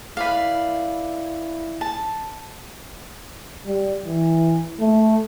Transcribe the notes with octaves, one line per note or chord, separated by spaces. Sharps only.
E4 B4 D5 F5
A5
G3
E3
A3